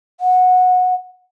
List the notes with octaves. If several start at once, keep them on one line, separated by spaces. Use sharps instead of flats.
F#5